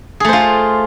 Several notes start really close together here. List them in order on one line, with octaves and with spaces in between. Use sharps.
G#4 A3 C5 F4